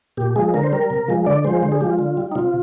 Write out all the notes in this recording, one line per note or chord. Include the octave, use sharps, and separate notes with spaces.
A#2 G4
F3 G#3 G#4
D3 A#4
C5
G3 A#4
C3
F3 G#3
D3 D5
F3 G#3 C5
D3 C5
G#4
F3 G#3 G4
F4
D3
G3
D#4
C3 F4